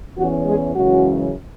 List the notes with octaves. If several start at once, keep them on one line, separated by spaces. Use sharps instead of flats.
E2 E3 C#4 F#4
G#3 G#4
F#2 C#3 E3 G#3 C#4 F#4